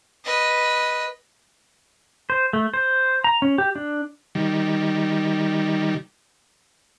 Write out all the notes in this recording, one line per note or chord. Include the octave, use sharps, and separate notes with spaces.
B4 D#5
C5
A3
C5
A#5
C#4
G4
D4
D#3 G3